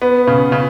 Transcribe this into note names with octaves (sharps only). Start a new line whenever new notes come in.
B3
C#3
C#3